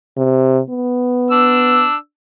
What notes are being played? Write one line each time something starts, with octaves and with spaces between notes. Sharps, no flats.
C3
B3
D4 E6